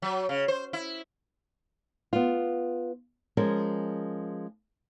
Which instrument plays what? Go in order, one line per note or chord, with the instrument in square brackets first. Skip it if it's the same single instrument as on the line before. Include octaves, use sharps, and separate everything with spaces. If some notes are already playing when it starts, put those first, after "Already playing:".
[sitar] F#3
C#3
C5
E4
[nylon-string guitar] B3 F4
F3 G#3 C#4 G#4 A#4